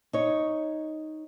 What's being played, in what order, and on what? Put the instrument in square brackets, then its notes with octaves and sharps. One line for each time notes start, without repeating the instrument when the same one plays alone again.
[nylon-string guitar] D#4 C#5